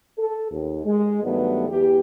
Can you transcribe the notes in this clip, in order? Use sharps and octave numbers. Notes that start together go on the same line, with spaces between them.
A4
D#2
G#3
G2 D#3 F#3 G3 A3 B3
E2 G4